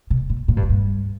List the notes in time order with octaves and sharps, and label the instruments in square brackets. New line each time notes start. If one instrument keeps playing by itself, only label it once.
[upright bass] B2
A#2
A#2
G2
F#2
G2